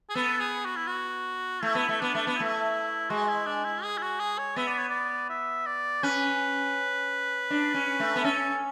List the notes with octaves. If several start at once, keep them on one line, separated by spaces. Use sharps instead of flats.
G#4
B3 A4
G#4
F#4
E4
F#4
A3 E4
B3
A3
B3 D4
A3
B3
A3 E4
G#3 F#4
E4
D4
E4
G#4
E4
F#4
G#4
C#5
B3 E5
D5
C#5
D5
E5
D5
C#4 B4
D4
C#4
A3
B3
C#4 A4